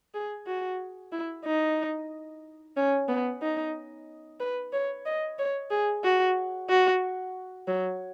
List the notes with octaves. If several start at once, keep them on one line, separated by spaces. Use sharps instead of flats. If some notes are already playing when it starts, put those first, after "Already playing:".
G#4
F#4
E4
D#4
C#4
B3
D#4
B4
C#5
D#5
C#5
G#4
F#4
F#4
F#3